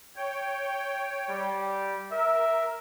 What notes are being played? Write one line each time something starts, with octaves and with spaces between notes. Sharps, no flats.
C#5 G5
G3
A#4 E5